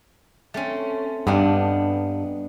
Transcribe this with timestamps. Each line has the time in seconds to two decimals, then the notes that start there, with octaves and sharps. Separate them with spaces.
0.54 A3 C4 C#4
1.27 G2 B3 D4 D#4